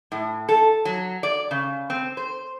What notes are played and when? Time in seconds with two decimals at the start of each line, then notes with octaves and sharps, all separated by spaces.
0.12 A2
0.49 A4
0.85 F#3
1.23 D5
1.51 C#3
1.90 C4
2.17 C5